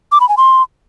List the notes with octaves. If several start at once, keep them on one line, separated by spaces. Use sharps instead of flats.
D6
B5
G#5
C6